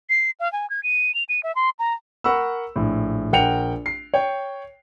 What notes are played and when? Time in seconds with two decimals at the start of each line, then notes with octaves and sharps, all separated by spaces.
0.09 C7
0.40 F5
0.53 G#5
0.70 G#6
0.83 D#7
1.14 F7
1.29 D#7
1.43 E5
1.55 C6
1.79 A#5
2.24 A#4 F#5 B5 C#6 E6
2.76 A#1 A2
3.33 A#1 A#4 F#5 G5 C#7 F7
3.86 C7
4.14 C#5 G5